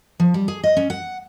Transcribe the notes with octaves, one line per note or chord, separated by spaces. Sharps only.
F3
G3
G#4
D#5
C#4
F#5